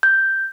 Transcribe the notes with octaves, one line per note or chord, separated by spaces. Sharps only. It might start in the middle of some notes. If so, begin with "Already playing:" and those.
G6